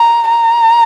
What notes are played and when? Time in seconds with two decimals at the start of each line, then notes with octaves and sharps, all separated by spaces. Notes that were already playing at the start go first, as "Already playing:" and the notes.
Already playing: A#5
0.29 A#5